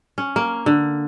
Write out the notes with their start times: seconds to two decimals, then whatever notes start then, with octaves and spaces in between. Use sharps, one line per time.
0.18 C#4
0.36 A#3
0.66 D3